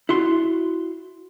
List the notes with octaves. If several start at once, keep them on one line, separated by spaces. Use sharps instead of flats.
E4 F#4 C6